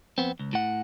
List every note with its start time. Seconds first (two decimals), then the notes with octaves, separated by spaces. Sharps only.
0.18 F2 B3 C4
0.39 C#2
0.53 A2 F#5